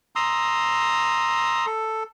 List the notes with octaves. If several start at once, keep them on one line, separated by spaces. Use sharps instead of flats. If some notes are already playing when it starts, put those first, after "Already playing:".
A#5 C6 D#6 E6
A4